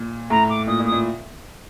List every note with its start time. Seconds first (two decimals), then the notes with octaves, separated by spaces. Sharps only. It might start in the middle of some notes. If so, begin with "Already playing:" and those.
Already playing: A#2
0.30 A2 A#5
0.49 D6
0.67 A#2 D#6
0.80 A#2
0.86 D#6
0.92 A#2